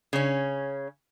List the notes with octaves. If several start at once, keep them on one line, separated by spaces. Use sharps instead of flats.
C#3 C#4